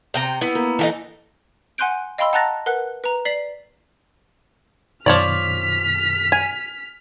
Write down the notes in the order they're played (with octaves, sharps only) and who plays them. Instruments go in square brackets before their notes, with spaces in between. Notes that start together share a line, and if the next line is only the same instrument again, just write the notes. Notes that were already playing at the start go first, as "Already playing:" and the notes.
[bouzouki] C3 G5 A#5
[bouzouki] B3 [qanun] E4
[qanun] A#3
[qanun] E3 [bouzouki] D#4 F#4 A4
[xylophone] F#5 G#5 C6 F#6 G6 D7
D#5 F5 G5 B5 C6 E6
F#5 A5 A#5 F#6 A6 A#6
A#4 B4 F#5 F#6
B4 A#5
D5 B6 C7 F#7
[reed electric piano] F#2 B2 D#3 [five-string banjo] F3 C#5 D5 [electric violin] F6 B6
[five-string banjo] G#5